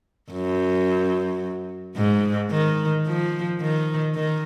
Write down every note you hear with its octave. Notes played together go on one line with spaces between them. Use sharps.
F#2
G#2
D#3
F3
D#3
D#3